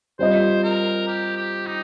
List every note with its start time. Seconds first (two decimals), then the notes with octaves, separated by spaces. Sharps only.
0.19 G3 C4 F4 C5 D#5
0.64 A#4
1.07 G4
1.37 G4
1.66 D#4